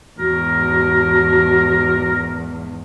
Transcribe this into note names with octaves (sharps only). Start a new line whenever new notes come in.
E2 G#2 F#4 A#4